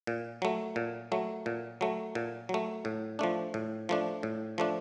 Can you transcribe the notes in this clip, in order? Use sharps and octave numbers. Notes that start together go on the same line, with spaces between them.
A#2
F#3 A3
A#2
F#3 A3
A#2
F#3 A3
A#2
F#3 A3
A2
F3 A3 D4
A2
F3 A3 D4
A2
F3 A3 D4